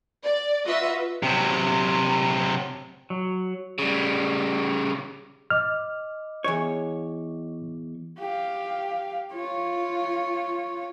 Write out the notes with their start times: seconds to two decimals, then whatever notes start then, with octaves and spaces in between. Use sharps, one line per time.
0.23 D5
0.65 F4 F#4 B4 D#5 E5
1.23 C3 F#3
3.10 F#3
3.78 C#3 G3
5.50 D#5 D6 F6
6.44 E2 C#5
8.19 G4 F5
9.32 F4 C#5